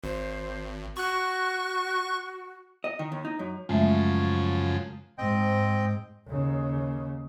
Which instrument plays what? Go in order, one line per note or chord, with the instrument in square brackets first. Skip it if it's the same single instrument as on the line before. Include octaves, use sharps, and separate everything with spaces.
[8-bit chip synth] G#1 [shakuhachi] C5
[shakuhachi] F#4 [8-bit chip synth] C#6 F#6
[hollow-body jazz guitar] D#5
D#3
D#2
D#4
F#2
[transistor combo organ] F#2 C#3 F3 [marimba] G#3 A3 E5
[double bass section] G#2 [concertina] C4 D#5 G5
[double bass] D#2 C#3